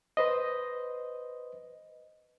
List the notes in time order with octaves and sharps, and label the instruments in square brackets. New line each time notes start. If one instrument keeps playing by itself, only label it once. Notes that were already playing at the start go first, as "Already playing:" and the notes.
[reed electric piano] B4 C5 D#5